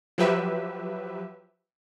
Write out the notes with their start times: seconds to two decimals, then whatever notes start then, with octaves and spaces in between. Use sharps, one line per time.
0.18 F3 F#3 G4 B4 E5